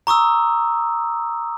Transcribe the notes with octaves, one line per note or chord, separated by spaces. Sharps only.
A#5 C#6 D#6 E6